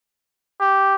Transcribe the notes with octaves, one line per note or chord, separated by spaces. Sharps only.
G4